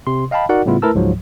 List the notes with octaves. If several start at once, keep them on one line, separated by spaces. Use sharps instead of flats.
C3 C6
D#5 F5 G5 A5 B5
D#4 F#4 A#4 D5 F#5
A2 C#3 G3 B3 E4 F4
A3 E4 A#4 B4 A5 E6
C#2 G#2 F3 F#3